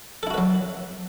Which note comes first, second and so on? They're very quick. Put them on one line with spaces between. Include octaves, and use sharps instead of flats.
A4 E4 F#4 B4 F#3